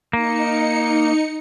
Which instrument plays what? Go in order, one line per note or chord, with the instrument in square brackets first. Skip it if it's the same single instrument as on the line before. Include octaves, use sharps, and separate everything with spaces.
[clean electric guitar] A#3 [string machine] D#4 C#7